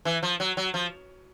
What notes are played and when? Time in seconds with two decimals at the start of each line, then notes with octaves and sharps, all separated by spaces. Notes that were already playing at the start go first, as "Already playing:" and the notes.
0.05 E3
0.23 F3
0.40 F#3
0.57 F#3
0.74 F3